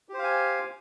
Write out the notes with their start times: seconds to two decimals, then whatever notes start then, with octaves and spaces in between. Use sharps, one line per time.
0.09 G4
0.14 C5
0.19 F5
0.24 G#5